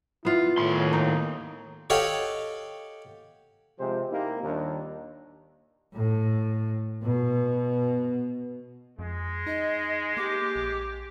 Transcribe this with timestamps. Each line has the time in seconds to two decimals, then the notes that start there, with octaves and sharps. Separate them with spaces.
0.25 B3 E4 F4
0.58 D#2 A2 C6
0.93 D#4
1.90 G4 A4 C#5 D#5 F5 F#5
3.79 C3 F3 G#3 G4 C5
4.11 A#3 D#4 E4 G4
4.43 D#2 A#2 D#3 G3 D4
5.94 A2
7.02 B2
8.99 F2 G#3
9.47 D#4 D#5
10.17 A#3 G4 D6
10.56 A#1